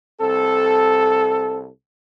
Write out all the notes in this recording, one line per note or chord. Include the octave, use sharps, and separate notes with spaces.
C2 C4 A4